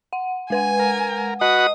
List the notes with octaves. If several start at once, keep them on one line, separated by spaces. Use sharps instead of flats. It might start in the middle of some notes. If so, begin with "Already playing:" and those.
F#5
G#3 B4 F#5 G#5
A#4
F#4 B4 D#5 F#5 D#6